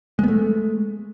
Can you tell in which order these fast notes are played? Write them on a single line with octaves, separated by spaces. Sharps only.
G#3 B3 A3